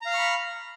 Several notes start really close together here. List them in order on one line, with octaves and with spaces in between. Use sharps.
A#5 F5 F6 C#6 B5